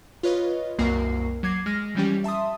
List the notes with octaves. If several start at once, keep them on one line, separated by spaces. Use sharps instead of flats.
F4 B4 C#5 D#5
C2 F#2 A#3 F#4 A#4 C7
F#3 D6 G#6 C7
G#3 F6 A#6
E3 F3 G3 C#4 G4
E5 A5 C6 D#6